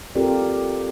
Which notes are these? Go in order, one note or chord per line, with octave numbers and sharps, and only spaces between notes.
C4 F4 G4 A4 A#4 D5